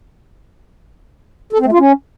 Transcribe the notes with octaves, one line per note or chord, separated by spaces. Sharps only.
A4
C4
A3
F4
C#4